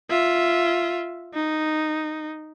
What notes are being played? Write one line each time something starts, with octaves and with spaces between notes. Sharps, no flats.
F4 E5
D#4